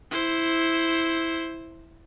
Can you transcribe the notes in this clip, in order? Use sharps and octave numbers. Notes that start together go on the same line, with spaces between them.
E4 C5